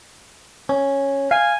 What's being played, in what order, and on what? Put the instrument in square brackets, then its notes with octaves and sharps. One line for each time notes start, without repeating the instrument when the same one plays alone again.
[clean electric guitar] C#4
[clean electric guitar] F5 [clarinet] G#5